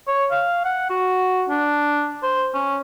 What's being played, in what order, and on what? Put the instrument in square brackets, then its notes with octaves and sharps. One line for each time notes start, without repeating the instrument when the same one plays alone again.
[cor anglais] C#5
F5
F#5
F#4
D4
C5
C#4